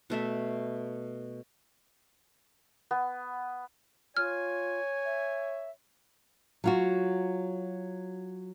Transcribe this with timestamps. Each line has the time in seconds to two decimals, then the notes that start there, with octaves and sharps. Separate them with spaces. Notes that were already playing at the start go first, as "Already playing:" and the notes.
0.10 B2 A3 E5
2.91 B3
4.17 F4 C#5 G#5 F6
5.05 E5
6.64 F#3 F4 F#4